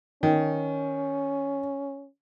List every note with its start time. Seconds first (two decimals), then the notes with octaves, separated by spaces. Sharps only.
0.23 D#3 C#4